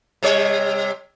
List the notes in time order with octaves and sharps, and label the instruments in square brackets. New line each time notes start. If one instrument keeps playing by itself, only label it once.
[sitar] C3 G3 C#5